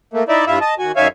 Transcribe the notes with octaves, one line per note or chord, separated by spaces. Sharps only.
A3 A#3
D#4 E4 D5 E5
G2 E4 F4 E5
D#5 A5
D#2 F#4 G#5
F#2 D#3 C#5 E5 F5 G#5